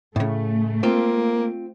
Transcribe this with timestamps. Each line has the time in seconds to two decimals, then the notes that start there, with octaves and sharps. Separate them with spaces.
0.16 A2 C#3 A3
0.83 A#3 C4 F4